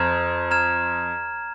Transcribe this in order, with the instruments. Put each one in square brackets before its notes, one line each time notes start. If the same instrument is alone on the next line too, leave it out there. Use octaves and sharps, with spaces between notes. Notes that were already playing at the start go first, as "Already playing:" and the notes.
Already playing: [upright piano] F2 [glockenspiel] A#5 F6 G#6 E7
[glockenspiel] A#5 F6 G#6 E7